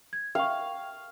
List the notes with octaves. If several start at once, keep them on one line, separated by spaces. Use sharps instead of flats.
G#6
F5 G5 C#6